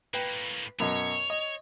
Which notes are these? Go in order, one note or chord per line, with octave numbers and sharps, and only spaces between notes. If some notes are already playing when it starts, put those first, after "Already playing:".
A2 A#3 B4 G5
F#2 B2 C#5
D#5